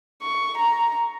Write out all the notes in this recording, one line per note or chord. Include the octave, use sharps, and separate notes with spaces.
C#6
A#5